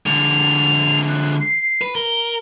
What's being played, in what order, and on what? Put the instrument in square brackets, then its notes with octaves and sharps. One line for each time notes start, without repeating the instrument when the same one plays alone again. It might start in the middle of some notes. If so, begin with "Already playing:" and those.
[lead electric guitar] D3 G#3 [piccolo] F7
[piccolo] F#6
C7
[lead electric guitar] B4
[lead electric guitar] A#4 [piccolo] G7